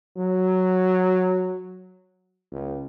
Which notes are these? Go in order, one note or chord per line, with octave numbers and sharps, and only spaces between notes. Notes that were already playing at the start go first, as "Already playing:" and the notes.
F#3
C#2